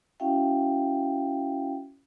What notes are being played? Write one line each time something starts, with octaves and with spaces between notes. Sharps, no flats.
C#4 E4 F#4 E5 F5 G5